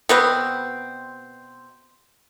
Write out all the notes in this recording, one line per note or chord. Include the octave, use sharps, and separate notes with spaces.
B2 B3 C4